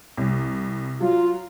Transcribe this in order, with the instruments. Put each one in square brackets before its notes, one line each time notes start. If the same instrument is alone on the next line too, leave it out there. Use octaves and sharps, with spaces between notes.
[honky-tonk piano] C2
[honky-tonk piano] F#3 [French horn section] F4